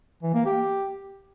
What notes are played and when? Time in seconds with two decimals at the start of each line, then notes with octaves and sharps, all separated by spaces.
0.23 E3
0.34 A#3
0.45 G4